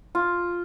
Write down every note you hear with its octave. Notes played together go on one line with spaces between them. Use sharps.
F4